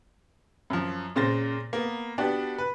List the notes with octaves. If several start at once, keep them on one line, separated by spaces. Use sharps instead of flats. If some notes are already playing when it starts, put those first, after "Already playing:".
F#2 F3
A#2 C#3 C5 A6 A#6
A#3 B3
B3 D4 F#4 G4
B4